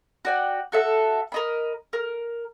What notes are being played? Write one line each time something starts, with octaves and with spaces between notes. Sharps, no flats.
F#4 D5 G5
F#4 A4 E5
A#4 D#5 B5
A#4